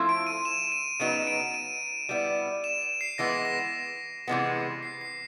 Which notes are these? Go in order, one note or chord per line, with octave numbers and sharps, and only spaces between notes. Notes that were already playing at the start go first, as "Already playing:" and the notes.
Already playing: F3 A3 C4 E4
D7
D#7
E7
D#7
C#3 F#3 B3 D#4 D7
D7
D#7
G3 B3 E4
E7
E7
C7
E3 G#3 B3 A#6
A#6
A#6
A#6
C3 E3 G#3 B3
C7
C7